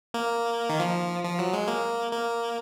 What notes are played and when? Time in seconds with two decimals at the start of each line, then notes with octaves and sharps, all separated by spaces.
0.14 A#3
0.69 D#3
0.80 F3
1.24 F3
1.39 F#3
1.53 G#3
1.68 A#3
2.12 A#3